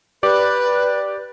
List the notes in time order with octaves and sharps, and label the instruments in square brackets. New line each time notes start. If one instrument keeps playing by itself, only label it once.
[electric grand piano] G4 D5 D6 [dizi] B4